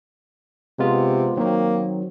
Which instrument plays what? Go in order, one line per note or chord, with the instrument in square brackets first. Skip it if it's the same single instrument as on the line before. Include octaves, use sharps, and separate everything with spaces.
[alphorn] C3 [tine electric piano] G#3 B3 F4
[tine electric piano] D#3 F#3 C4 [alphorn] A#3